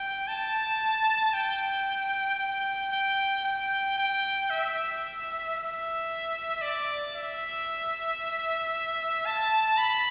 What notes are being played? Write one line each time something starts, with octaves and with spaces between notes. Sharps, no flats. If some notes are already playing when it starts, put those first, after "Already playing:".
Already playing: G5
A5
G5
G5
G5
G5
G5
E5
E5
D5
E5
A5
B5